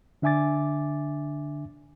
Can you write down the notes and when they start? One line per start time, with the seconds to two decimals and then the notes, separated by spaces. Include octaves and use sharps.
0.22 D3 D4 E5 G#5 D6 A6